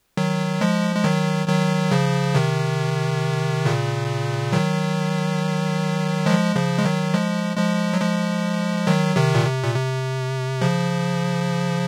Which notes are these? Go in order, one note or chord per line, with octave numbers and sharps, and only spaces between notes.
D#3 F#3
F3 G#3
G#3
D#3 F#3
D#3 F#3
C#3 F3
C3 D#3
A#2 C#3
D#3 F#3
F3 G#3
C#3 F3
G#3
D#3 F#3
F3 G#3
F3 G#3
F#3
F3 G#3
D#3 F#3
C3 D#3
A#2
C3
A#2
C3
C#3 F3